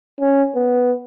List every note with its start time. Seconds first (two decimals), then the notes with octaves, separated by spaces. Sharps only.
0.21 C#4
0.55 B3